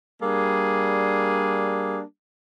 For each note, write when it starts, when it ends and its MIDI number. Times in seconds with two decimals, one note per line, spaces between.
0.22 2.01 55
0.22 2.01 58
0.22 2.01 62
0.22 2.01 68